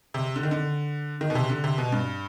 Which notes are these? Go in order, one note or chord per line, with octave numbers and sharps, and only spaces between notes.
C3
D3
D#3
D3
D#3
B2
C3
D3
C3
B2
G2